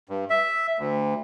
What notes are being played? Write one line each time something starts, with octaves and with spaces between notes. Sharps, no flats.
G2
E5
D2